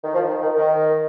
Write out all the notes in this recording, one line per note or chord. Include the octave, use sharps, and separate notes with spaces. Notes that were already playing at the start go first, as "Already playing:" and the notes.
D#3
F3
D#3
D#3
D#3